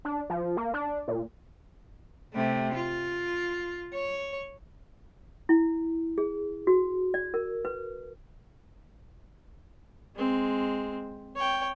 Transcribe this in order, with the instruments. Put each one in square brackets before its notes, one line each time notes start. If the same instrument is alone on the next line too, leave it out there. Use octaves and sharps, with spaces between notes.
[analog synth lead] D4
F3
A#3
D4
A#2
[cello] C3 A3
F4
C#5
[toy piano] E4
G#4
F#4
D5
A#4
B4
[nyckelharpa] G#3 C4
C#5 G5